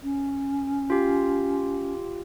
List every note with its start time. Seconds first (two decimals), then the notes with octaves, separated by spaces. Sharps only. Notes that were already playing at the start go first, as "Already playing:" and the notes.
0.03 C#4
0.90 F4 G4